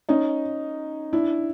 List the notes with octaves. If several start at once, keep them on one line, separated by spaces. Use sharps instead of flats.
C#4 D#4
D4 E4